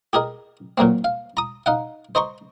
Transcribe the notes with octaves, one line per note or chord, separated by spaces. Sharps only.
G4 G#4 A#4 D#5
A#2 F#3 A#3 C4
F5
A#5 D#6
D#4 F5 F#5
C5 D#5 A#5 C6 C#6